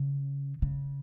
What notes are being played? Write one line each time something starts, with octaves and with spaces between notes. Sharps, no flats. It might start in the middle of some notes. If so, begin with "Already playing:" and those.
Already playing: C#3
C#3